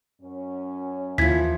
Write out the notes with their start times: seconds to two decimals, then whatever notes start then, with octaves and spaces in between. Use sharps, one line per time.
0.21 F#2 C#4
1.18 D#2 E3 F3 G#6 B6